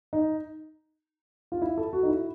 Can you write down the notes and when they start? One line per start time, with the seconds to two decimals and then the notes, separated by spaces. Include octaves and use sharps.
0.13 D#4
1.52 F4
1.62 E4
1.78 A4
1.93 F#4
2.03 D#4
2.08 E4